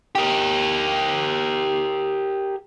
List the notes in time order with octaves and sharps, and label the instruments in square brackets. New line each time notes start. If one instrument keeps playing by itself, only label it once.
[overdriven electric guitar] G4 A#4